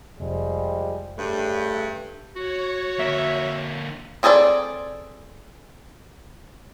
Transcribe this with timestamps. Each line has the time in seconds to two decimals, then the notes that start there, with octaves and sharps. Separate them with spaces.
0.20 F1 F3 G3 G#3
1.17 G2 C#3 A3
2.36 F#4 C#5
2.99 D3 A#3 E5
4.23 C4 G#4 A4 B4 D5